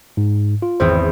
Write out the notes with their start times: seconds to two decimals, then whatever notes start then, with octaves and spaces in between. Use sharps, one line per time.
0.17 G#2
0.62 F4
0.80 G#1 E2 C4 C5